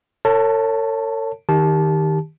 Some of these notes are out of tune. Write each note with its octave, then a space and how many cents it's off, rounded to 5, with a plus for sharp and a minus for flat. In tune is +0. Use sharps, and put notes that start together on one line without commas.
A4 +45 C#5 +0 A5 +5
D#3 +0 G4 +15 A5 -20